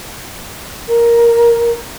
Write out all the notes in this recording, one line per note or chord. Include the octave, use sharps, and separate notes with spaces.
A#4